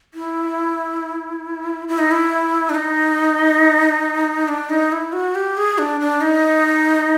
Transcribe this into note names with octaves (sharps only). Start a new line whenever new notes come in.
E4
E4
D#4
E4
D4
D#4
D4
D#4
E4
F#4
G4
G#4
D4
D4
D#4